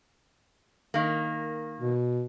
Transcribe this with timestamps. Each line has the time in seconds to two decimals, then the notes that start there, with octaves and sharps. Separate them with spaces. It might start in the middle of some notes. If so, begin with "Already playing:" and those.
0.94 D#3 A#3
1.81 B2